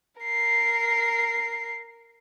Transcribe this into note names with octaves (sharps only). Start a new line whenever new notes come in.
A#4 C7